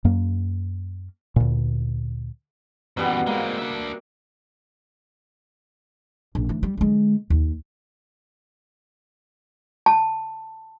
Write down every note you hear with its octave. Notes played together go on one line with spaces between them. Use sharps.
F#2 A#3
D2 A#2
F#2 B2 E3 G3 B3
G#3 A#3 C4
D4 E5
A#1
D2 E3
G3
D3 G#3
D#2
A5